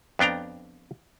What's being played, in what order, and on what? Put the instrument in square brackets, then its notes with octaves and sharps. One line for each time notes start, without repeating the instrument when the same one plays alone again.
[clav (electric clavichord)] F2 B3 D4 G5 A#5